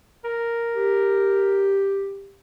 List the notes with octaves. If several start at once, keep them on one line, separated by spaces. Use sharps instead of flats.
A#4
G4